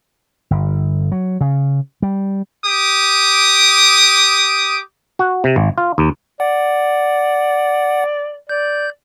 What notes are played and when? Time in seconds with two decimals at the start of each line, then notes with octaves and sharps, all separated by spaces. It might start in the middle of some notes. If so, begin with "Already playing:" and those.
0.51 G1
1.12 F#3
1.41 C#3
2.02 G3
2.66 G4 D6 D#6
5.19 F#4
5.44 C3
5.56 G#1
5.78 F4
5.98 D#2
6.40 D5 F#5
8.49 D5 G6